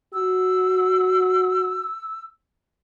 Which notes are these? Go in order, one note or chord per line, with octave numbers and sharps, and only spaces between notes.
F#4 E6